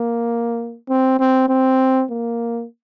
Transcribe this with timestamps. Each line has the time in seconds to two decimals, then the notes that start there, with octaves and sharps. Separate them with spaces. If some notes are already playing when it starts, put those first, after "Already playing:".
Already playing: A#3
0.89 C4
1.19 C4
1.49 C4
2.10 A#3